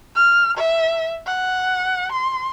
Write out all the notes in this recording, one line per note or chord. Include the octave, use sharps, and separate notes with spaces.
F6
E5
F#5
C6